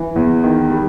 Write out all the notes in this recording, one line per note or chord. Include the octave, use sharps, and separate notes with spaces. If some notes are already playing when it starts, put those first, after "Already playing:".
Already playing: E3
E2
D#3
G3